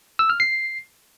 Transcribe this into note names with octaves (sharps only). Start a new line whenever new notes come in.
E6
F6
C7